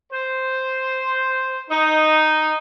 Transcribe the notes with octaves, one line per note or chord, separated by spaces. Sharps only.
C5
D#4